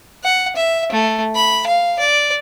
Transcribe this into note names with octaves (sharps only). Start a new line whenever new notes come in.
F#5
E5
A3
B5
F5
D5